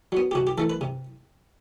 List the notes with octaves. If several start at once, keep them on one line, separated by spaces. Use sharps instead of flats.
F#3 B3
G4
C3 F#4
G4
E3 A3 A4
B4
C3